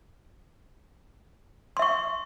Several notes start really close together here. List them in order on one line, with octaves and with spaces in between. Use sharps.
C6 E5 C#6